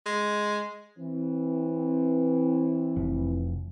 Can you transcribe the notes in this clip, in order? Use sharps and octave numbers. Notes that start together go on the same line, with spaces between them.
G#3
E3 C4
F1